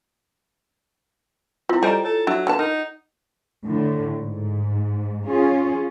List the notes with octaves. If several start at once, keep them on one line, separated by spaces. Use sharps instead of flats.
C4 E4 F4
G3 G4 A4 C5 D#5 G#5 A#5
A4 C#5
F#3 D4 E4
D3 B3 F#5 A5
D#4 A#4
A2 D3
G#2
C#4 F4 G#4